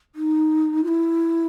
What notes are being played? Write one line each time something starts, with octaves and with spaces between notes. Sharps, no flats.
D#4
F4
E4